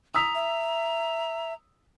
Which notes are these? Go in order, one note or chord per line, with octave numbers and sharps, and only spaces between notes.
A#5 D#6 E6 B6
E5